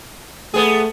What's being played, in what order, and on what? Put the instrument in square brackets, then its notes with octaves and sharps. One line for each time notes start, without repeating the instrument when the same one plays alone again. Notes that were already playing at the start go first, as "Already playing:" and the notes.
[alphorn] A3 [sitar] B3 G#4